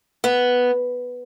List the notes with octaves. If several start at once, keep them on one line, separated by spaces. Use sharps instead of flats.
B3